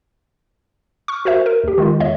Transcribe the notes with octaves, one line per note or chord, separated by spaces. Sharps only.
C#6 F6
F#4 A#4 C5 E5
A#4
D#2 G4
D#3 G#3 F4
E2 D3 C#5 D#5 E5